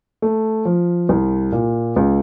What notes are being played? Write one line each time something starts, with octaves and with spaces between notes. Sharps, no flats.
A3
F3
C2
A#2
C#2